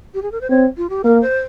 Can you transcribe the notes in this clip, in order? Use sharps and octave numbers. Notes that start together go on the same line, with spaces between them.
G4
G#4
A#4
C5
C4 C#5
F4
G4
A#3 A#4
C5